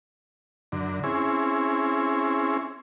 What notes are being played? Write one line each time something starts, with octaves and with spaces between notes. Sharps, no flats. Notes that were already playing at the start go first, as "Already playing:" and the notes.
F#2 D3
C4 C#4 E4 G#4